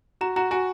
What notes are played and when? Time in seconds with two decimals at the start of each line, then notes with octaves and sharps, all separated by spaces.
0.21 F#4 A#5
0.36 F#4 A#5
0.51 F#4 G#5